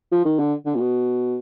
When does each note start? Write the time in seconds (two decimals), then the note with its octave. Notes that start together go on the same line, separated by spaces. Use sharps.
0.12 F3
0.25 D#3
0.39 D3
0.66 D3
0.75 A#2
0.80 B2